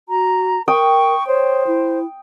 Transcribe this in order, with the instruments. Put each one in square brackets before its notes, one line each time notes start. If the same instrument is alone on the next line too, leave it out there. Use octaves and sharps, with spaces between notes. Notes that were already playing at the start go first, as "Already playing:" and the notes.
[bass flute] F#4 [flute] A#5
[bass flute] A#4 [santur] G5 D#6 [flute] C#6
[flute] C5 [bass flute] C#5
[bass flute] E4